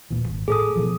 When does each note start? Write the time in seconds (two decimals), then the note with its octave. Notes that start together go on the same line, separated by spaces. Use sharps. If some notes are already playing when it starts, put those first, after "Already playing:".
0.11 D#1 A#2 E3
0.29 G#1
0.48 A2 G#4 A4 D#6
0.76 B2 E3 F3